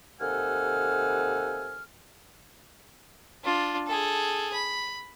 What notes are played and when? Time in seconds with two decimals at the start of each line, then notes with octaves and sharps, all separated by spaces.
0.20 D#2 C3 A4 F#5 G#5 F6
3.44 D4 F4
3.88 G#4 A4
4.53 B5